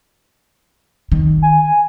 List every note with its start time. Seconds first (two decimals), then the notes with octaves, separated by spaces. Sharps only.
1.12 D#3
1.42 G#5